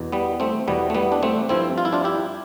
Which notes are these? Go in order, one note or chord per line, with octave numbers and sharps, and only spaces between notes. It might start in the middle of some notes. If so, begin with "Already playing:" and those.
Already playing: E2 B2
G3 B3
A3 C4
E2 B2 G3 B3
A3
G3 B3
D4
A3 C4
G2 F3 C4 E4
F4
E4
D4 F4
E4 G4